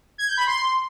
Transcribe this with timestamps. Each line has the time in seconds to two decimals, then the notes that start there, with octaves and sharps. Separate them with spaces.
0.18 G#6
0.28 G6
0.37 B5
0.47 C6